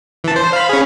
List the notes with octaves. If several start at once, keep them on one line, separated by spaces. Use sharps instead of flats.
E3 A5
C5
F5 B5
C#4 G#4